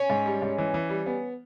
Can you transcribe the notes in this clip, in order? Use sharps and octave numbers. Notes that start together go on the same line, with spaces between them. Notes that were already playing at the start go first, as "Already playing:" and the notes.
Already playing: C#4
G#2
G3
G#2
E3
E3
G3
B3